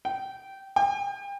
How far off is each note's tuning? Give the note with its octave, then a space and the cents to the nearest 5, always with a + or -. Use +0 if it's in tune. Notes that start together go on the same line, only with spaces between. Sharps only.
G5 -15
G5 +35